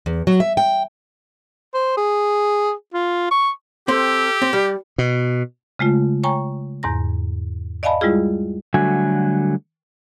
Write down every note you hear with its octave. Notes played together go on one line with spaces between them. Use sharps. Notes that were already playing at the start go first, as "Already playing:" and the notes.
E2
F#3
E5
G5
C5
G#4
F4
C#6
C4 G4 A4 C6
C4
G3 D5
B2
C#3 G#3 A3 F4
C#5 G5 G#5 A#5 C#6
E2 G#2 A#5 A#6
D5 D#5 F5 G#5 A5 B5
G3 G#3 E4 F4 G#4
D3 F#3 G3 A3 F#4 G#5